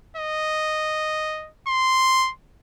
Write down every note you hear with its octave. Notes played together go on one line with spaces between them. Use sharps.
D#5
C6